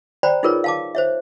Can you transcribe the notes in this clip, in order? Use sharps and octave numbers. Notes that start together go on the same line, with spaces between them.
C5 D5 G5 A#5 B5
D#4 F4 G#4 A#4 B4 C#5
F5 A5 D6
C5 C#5 E5